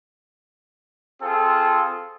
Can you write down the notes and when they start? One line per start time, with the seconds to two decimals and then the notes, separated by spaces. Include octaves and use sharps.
1.21 C4 F4 G#4 A4